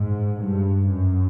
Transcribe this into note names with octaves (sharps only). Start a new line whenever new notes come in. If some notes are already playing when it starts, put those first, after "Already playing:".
Already playing: G#2
G2
F#2